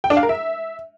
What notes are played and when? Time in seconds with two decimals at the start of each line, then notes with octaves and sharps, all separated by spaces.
0.04 G5
0.10 D4
0.17 F5
0.23 A#4
0.29 E5